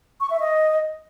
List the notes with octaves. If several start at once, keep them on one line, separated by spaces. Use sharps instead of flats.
C#6
E5
D#5